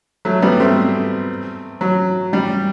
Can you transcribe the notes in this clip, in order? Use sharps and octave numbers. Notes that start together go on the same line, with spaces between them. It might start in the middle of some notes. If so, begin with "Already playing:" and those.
F#3 A3
G3 B3
A3 C4
F#3
G3